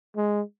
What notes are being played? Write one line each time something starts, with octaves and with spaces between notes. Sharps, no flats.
G#3